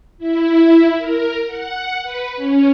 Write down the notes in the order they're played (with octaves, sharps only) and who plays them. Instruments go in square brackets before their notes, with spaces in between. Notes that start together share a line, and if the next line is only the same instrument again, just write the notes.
[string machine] E4
A#4
F#5
B4
C#4